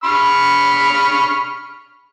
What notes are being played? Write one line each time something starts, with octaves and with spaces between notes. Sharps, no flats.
B5 C#6 F6